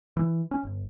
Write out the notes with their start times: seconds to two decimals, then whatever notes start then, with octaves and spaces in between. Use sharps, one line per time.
0.17 E3
0.51 C#4
0.63 G1